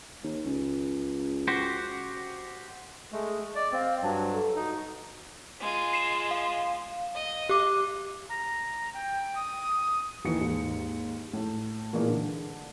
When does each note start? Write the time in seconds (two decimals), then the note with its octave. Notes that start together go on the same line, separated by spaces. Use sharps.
0.23 D#2
0.45 C#2
1.48 F#4 G4 C5
3.12 G#3 A3 G#4
3.55 D5 D#5
3.72 C4 F5
4.02 G2 F#3 A5
4.32 A4
4.56 D#4 F#4
5.61 G#3 F4
5.93 C7 E7
6.31 F5
7.15 D#5
7.49 G4 D6
8.29 A#5
8.94 G5
9.36 D#6
10.24 D#2 D#3 E3 C#7
10.41 D#2 G#2
11.33 A2
11.93 A#2 E3 G#3 A#3
12.09 D3